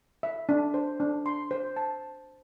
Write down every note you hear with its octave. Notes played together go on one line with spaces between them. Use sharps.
E5
D4
C5
D4
C6
C5
A5